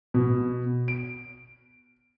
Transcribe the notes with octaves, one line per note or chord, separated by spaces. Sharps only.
B2
D7